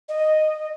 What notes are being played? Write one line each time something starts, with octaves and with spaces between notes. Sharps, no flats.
D#5